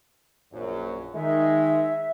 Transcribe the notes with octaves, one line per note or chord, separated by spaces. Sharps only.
A#1 F#2
D#3 G#3 D#4 E5